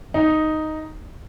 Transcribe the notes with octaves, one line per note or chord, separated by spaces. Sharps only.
D#4